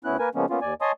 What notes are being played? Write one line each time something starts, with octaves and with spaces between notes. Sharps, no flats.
D2 B3 C#4 E4 F#6
A#3 A#4 B4 G#5
C#3 F3 G#3 A#3 B3 C#4
A#3 B3 C#4 F4
D#2 D5 G#5
C#5 D#5 G#5 A5 C6 D#6